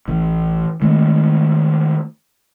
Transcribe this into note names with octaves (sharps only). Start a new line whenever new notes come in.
A1 E3
D#3 G#3 A3 C4